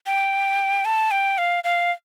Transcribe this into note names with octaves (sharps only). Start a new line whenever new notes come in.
G5
A5
G5
F5
F5